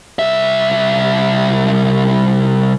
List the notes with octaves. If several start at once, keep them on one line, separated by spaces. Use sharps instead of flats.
C2 E5